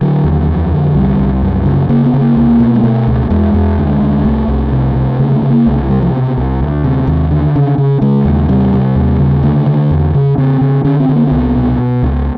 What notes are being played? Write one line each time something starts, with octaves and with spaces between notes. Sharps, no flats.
D3 F#3
D#2
F2
D3
C2 G3
C2
F#2
C#3
C#3 A#3
B3
C#3
A#3
C2 A#3
B2
G#3
B2 A3
C#2
E2 G#3
E2
D2
D2
C2 A3
C2
C3
C3
C#3 A3
G#3
A3
C#3
A#3
C2 A3
C3 G3
F3
B2
C2
D2
C3
D#2
D3
C#3
C#3
C#3 G#3
D#2
C3 G3
C3
D#2
C#3
D3 A3
D3
E2
C#3
C#3 C4
C#3
D3 C#4
C4
D3
A#3
C4
C2 B3
B2
B2
C#2